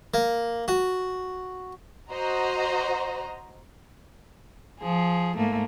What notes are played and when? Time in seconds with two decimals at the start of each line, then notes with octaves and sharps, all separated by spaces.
0.14 A#3
0.68 F#4
2.10 F#4 C5 D#5 A#5
4.79 F3 G#4
5.37 G#2 A3 A#3